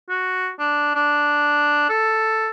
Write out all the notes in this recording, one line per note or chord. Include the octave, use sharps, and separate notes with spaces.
F#4
D4
D4
A4